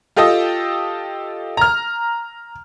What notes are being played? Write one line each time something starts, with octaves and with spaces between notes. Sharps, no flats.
F4 G4 A4 D#5
A#5 F6